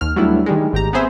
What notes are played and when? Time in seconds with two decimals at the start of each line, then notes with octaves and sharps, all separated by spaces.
0.01 D#2 F6
0.16 F#3 G3 A3 B3 D4 E4
0.46 D#3 G3 G#3
0.73 G#1 G4 A#5
0.93 B3 C4 G#4 C5 E5